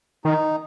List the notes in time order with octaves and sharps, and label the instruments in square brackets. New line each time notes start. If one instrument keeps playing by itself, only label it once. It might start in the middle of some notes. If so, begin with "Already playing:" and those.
[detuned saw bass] D#3 [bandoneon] D#4